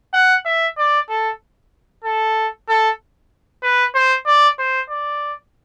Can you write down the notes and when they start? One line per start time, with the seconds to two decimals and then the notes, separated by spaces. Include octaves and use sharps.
0.14 F#5
0.45 E5
0.78 D5
1.10 A4
2.04 A4
2.68 A4
3.63 B4
3.95 C5
4.27 D5
4.59 C5
4.90 D5